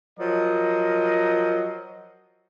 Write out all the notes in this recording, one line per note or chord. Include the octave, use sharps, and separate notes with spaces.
F3 F#3 A#4 D#5